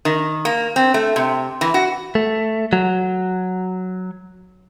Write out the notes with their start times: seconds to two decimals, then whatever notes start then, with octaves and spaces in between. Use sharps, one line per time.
0.05 D#3
0.45 A#3
0.76 C4
0.94 A3
1.16 C3
1.61 E3
1.74 F#4
2.15 A3
2.73 F#3